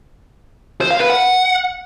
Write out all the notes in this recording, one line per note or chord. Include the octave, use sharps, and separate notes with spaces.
C5
F5
B4
F#5